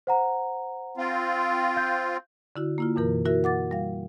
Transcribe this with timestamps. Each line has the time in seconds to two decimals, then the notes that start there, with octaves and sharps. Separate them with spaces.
0.07 C5 F#5 A#5
0.97 C4 F4
1.76 F5 G6
2.56 D3 E4 F#4
2.78 A#3 E4 F4
2.96 F#2 B2 E3 A#4
3.25 E4 F#4 A#4 E5
3.44 F#5 D6 A6
3.71 G3 F5